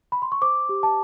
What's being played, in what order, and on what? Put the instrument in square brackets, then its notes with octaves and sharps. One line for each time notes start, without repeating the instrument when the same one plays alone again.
[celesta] B5
C6
C#6
C5 D6
G4
A5